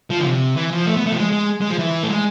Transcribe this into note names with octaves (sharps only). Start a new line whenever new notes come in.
F3
D3
C3
E3
F3
A3
B3
A3
F3
G#3
G#3
G#3
F3
E3
A3
G#3